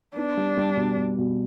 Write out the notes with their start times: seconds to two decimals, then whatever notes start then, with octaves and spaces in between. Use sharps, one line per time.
0.16 B3 D4
0.37 G3
0.57 G3
0.77 B2
0.97 B2
1.18 B2